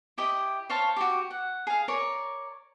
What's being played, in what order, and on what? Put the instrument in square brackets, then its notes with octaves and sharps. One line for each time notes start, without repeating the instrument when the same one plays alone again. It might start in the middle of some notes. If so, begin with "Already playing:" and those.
[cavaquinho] E4 G4 D#5
C5 C#5 F5 A5
F#4 G4
F#5
G#4 F5
A#4 C#5 D5 A#5